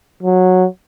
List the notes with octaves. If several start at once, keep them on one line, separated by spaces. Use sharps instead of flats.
F#3